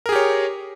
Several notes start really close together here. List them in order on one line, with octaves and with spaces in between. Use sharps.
A#4 G#4 G4 C#5